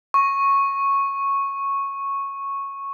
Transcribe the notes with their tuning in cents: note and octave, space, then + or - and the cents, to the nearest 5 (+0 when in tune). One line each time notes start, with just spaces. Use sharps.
C#6 -10